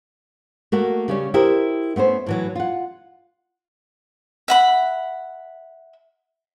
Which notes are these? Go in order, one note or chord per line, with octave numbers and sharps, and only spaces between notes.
A3 A#3 F#4
C#3 G3 C#4
E4 G4 A#4 C5 D#5
A3 B3 C#4 C5
A2 E3 F#3
F4 F#5
E5 F#5 B5